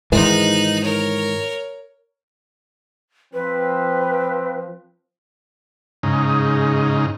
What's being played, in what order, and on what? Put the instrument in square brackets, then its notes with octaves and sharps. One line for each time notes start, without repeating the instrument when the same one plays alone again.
[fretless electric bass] G#2 D#3 E3 [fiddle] D#4 F#6
[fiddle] A#4 C#5
[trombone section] F3 C4 [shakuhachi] B4
[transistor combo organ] G#2 C#3 D#4